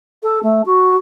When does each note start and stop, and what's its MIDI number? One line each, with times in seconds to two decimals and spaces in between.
0.23 0.39 69
0.43 0.62 57
0.65 0.95 66